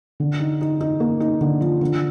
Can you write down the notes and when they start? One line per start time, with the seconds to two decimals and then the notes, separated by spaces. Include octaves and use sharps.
0.20 D3
0.40 D#4
0.61 D#4
0.81 D#4
1.00 A#3
1.20 D#4
1.41 D3
1.61 F3
1.81 D3